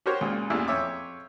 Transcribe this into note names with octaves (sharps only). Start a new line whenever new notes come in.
F#4 G4 A#4 C5 C#5
C#2 A#2
A1 E2 A#2 E4
F2 C#5 E5 D6